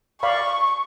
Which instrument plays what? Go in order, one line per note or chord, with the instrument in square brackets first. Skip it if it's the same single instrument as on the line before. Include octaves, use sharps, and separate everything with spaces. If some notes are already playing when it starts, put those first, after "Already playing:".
[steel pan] D5 F5 B5 [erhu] C#6